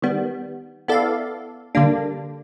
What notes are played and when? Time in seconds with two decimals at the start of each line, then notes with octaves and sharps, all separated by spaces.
0.02 D#3 G3 B3
0.88 B3 E4 A4 D5 F5
1.75 D3 G3 A#3 D4